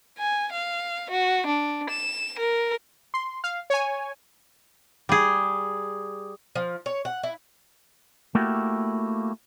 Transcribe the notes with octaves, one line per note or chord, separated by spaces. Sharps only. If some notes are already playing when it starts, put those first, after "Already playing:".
G#5
F5
F#4
D4
E7
A#4
C6
F5
C#5 G#5
G3 G#4
F3
C#5
F#5
E4
A3 A#3 E4 F#4 G4